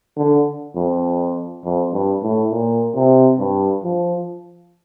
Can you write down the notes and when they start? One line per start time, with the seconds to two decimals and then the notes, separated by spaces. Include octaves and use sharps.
0.17 D3
0.75 F2
1.64 F2
1.92 G2
2.23 A2
2.51 A#2
2.96 C3
3.39 G2
3.83 F3